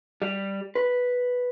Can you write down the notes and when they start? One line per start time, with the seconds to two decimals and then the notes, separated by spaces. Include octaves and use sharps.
0.22 G3
0.75 B4